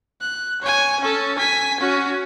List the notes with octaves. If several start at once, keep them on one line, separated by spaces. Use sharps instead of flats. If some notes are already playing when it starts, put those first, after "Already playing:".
F#6
C#5 G#5
C#4 A4
G#5 B6
C#4 F#4